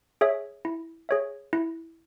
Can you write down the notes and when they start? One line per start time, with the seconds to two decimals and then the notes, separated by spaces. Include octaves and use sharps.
0.21 G#4 C#5 E5
0.65 E4
1.09 G#4 C#5 E5
1.53 E4